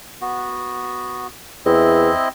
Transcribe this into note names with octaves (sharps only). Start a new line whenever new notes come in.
B3 F#4
E2 C4 E4 D#5